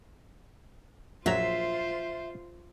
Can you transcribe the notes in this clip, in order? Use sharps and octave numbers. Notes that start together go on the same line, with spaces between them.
A#1 F#3 F4 C5 E5 A#5